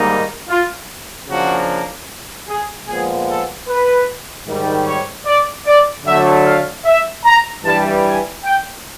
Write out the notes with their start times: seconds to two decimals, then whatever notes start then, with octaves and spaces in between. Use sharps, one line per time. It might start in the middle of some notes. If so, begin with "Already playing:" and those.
Already playing: G#2 D#3 G3 A#3 D#4
0.49 F4
1.28 C#3 F3 A#3 D4 F#4
2.48 G#4
2.87 A#2 F3 G#3 B3 G#4
3.27 A4
3.68 B4
4.47 G#2 D#3 G3
4.86 C#5
5.26 D5
5.66 D5
6.06 D3 F#3 A3 E5
6.45 F5
6.85 E5
7.25 A#5
7.65 G2 E3 G3 A5
8.04 G#5
8.44 G5